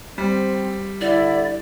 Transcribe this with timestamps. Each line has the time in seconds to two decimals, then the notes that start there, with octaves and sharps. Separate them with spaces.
0.18 G3 C4
1.01 D3 E4 D5